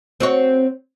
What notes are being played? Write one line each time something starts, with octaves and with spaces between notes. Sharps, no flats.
C4 F#4 C#5